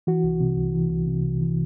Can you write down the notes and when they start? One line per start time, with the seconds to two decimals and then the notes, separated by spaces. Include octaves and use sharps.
0.07 E3 F#4
0.24 C2
0.40 C3
0.57 C2
0.74 E3
0.90 C2
1.07 C3
1.23 C2
1.41 E3